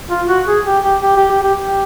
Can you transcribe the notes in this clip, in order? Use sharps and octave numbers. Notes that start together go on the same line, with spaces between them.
F4
F#4
G#4
G4
G4
G4
G4
G4
G4
G4